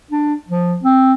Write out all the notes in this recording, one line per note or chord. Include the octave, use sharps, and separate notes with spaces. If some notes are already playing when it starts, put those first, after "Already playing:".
D4
F3
C4